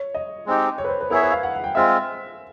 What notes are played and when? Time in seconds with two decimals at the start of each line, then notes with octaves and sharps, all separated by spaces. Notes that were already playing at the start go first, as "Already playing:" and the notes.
Already playing: C#5
0.14 D#5
0.46 G#3 C4 D#4 G4
0.78 C#5
0.84 B4
0.89 C5
1.01 B4
1.10 B3 E4 G#4 A#4 C#5 E5
1.22 B4
1.32 F5
1.43 F#5
1.54 F#5
1.64 G5
1.75 G#3 C4 F4 E5